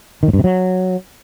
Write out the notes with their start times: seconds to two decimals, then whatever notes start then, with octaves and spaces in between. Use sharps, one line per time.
0.23 D#3
0.28 A2
0.33 G2
0.39 C3
0.44 F#3